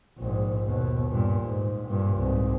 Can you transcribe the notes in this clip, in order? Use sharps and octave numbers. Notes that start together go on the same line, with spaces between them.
A#1 G#2
D#2 B2
G2 A#2
G#2
G2 A#2
C2 G#2